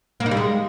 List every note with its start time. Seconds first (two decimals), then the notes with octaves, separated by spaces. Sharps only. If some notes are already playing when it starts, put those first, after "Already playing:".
0.20 A#3
0.26 D#4
0.31 G3
0.37 G#3